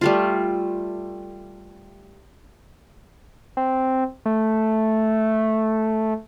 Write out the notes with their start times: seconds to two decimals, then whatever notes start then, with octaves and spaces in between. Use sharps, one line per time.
0.01 G3 A3 F4
3.57 C4
4.26 A3